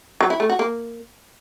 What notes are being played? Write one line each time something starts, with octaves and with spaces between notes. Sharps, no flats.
F#3
E4
A3
F#4
A#3